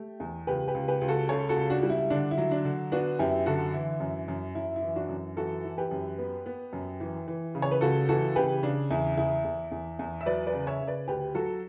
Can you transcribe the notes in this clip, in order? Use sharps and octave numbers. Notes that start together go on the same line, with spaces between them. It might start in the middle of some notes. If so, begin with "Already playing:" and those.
Already playing: A3 G4
E2
C#2 G4 B4
G4 B4
C#2
G4 B4
C#2
F#4 A4
C#3 A4 C#5
F#4 A4
C#2
D4 F#4
G3
E4
D3 D4
E4
F#3
D4
D3
B3 D4 F#4
F#2 E4 G4
D3 F#4 A4
E3 E4
F#2
F#2
F#2 E4
E4
E3
D4 F#4
F#2
E3 F#4 A4
E3
G4 B4
F#2
B3
B3
F#2
E3
E3
C#3
C#5
B4
C#2 F#4 A4
E3 F#4 A4
C#3 G4 B4
C#3 D4
E2 E4
E2 E4
E2
E2
E2
E5
F#3 B4 D5
B4 D5
C#3
C#5 E5
C#3
B4 D5
D2 G4 B4
F#3 F#4 A4